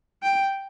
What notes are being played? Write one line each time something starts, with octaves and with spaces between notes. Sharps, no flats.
G5